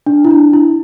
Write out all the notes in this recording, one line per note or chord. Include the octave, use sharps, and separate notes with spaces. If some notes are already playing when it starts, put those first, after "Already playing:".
D4
E4
D4
E4